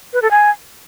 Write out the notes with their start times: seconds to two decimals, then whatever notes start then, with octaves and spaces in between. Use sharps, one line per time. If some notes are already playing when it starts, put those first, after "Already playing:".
0.13 B4
0.22 A4
0.31 G#5